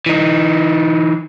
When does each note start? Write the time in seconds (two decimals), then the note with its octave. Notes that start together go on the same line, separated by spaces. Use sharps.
0.06 E3 D#4